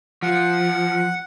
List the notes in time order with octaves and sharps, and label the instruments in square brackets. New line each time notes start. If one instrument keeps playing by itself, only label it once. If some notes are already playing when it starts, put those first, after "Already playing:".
[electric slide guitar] F3 [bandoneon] F#5